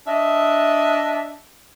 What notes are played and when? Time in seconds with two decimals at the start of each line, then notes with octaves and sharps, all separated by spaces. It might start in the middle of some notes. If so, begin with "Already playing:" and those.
0.07 D4 D#5 E5